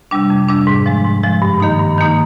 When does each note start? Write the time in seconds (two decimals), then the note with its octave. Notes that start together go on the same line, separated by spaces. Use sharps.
0.11 C3 G3 D4
0.30 F2
0.48 C3 G3 D4
0.67 G#2
0.86 F3 G#3
1.05 G#2
1.23 F3 G#3
1.42 G2
1.60 D#3 A#3 D#4
1.79 G2
1.98 D#3 A#3 D#4